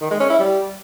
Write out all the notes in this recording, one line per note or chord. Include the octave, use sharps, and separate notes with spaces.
D#3
G#3
C#4
E4
G3